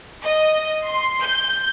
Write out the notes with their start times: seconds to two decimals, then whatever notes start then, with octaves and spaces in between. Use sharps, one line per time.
0.23 D#5
0.86 C6
1.21 G6